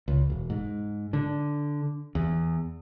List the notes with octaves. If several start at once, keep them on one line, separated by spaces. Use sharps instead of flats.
C#2
E1
G#2
D3
E2